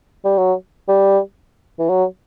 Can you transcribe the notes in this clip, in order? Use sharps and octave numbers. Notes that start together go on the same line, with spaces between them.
G3
F#3
G3
E3
F#3